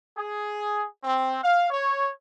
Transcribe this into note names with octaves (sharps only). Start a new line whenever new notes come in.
G#4
C4
F5
C#5